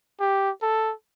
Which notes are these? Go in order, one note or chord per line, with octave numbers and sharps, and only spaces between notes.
G4
A4